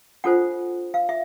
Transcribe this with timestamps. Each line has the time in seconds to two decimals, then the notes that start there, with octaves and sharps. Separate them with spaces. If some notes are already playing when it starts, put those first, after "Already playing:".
0.24 D4 F4 A4 C5 F#5
0.94 F5
1.09 E5